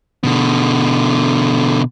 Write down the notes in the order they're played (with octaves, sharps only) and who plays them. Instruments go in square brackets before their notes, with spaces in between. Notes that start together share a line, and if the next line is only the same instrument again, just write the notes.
[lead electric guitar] B2 D3